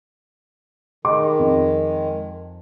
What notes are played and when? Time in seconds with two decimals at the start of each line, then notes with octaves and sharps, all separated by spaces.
1.05 D#3 G#3 D#5 D6
1.39 F2